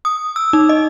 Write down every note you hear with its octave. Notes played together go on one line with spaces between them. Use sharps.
D#6
E6
D#4
D#5